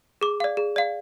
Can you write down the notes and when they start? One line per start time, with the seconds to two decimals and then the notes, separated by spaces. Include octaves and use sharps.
0.21 G#4 D6
0.40 D5 F5
0.57 G#4
0.76 D5 F5